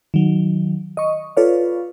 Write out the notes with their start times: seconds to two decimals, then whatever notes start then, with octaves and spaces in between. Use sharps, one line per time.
0.14 D#3 F#3
0.97 D#5 C#6
1.37 F4 A4 B4 C#5 D5 F5